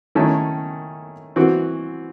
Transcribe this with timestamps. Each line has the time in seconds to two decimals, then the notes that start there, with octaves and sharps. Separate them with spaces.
0.15 D#3 A3 C#4 E4 A4
1.36 E3 C4 F#4